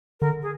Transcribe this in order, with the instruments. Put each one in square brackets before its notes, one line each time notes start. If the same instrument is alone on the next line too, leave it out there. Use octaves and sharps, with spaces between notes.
[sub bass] D3 [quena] A#4
[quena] G#4